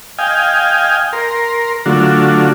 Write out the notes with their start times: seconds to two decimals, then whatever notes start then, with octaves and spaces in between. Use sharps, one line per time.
0.19 D#5 F5 G5 G#5
1.13 A#4 C6
1.86 D3 F#3 A3 D4 F4 F#4